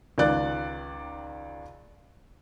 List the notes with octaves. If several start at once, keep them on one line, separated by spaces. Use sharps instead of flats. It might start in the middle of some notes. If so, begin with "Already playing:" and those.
C#2 D#3 D5 F#6